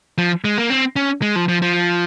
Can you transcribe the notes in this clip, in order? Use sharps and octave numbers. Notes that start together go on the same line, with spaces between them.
F3
G#3
A#3
C4
C#4
G#3
F3
F3
F3